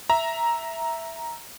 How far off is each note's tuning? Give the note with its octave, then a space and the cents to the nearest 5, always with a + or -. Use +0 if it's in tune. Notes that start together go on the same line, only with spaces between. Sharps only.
E5 +0 A#5 +5